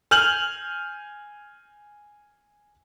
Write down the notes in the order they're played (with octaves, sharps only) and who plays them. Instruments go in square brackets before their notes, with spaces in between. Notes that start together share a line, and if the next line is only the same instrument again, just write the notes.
[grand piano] G#5 F6 G6 F7 F#7